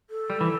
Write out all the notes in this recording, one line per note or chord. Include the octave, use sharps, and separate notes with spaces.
A4
G3
E3